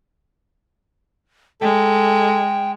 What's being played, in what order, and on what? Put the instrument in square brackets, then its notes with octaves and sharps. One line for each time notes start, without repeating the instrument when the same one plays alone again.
[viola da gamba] G#3 [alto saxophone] A4 [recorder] G5